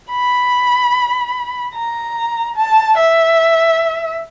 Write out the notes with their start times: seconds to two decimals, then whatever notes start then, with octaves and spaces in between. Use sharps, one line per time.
0.11 B5
1.75 A#5
2.56 A5
2.98 E5